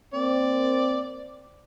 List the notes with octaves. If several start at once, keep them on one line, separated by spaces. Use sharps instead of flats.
A#3 C4 D5